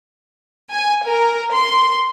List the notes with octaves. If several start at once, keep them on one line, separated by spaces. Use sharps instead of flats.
G#5
A#4
C6